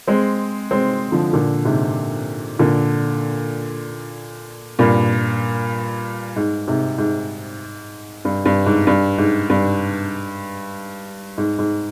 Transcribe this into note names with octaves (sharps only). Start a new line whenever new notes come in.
G#3 C4
G#3 C4
D3 F3
A#2 D3
G#2 C3
A#2 D3
G2 A#2
G#2
G#2 C3
G#2
G2
G2
G#2
G2
G#2
G2
G#2
G#2